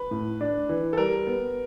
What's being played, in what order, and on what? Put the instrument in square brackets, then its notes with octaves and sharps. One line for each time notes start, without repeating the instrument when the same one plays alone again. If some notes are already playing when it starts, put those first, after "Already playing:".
Already playing: [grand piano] B4
[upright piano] A2
D4
E3
[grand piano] A4
[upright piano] G3 [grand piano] A#4
[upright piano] B3